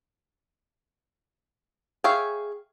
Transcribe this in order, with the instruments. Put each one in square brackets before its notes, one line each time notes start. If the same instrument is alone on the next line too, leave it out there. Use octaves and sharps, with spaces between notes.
[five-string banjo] G#4 C#5 E5 F5 G5